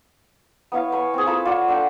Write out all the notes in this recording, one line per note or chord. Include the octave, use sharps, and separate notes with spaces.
B3 E4 C#5 F5
C#5 G#5 B5 C6
C4 G#4
F4 A4 A5 B5
F4 C#5 D5 F#5
D4 A4 F#5 G5